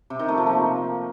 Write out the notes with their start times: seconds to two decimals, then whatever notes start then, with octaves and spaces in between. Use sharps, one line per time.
0.10 C3
0.19 D#3
0.28 A3
0.38 F3
0.47 A#3